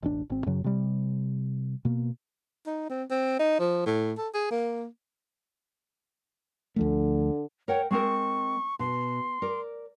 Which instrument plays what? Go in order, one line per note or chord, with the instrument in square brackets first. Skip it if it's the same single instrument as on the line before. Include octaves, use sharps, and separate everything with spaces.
[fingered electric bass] E1 A1 D4
G#1 C4
F#2 C#3 F#3
C3 G3
B2 A#3
[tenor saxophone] D#4
C4
C4
D#4
F3
A2
A4
G#4
A#3
[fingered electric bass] D2 F3 A3 [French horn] D3
[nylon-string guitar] A#4 F#5 G5 [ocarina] C#5
[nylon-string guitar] G#3 C4 A#4 [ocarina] C#6
[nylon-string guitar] B2 [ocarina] C6
[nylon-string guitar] A#4 D5